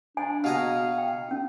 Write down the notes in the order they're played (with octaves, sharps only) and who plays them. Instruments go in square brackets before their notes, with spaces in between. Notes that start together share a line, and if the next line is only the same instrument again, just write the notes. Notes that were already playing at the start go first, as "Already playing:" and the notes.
[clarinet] D4 [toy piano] G#5
[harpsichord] B2 G#4 A#5 [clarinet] F5
[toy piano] G5
C#4 D4